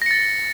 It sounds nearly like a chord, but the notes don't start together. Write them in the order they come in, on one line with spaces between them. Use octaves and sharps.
A#6 C#7 A6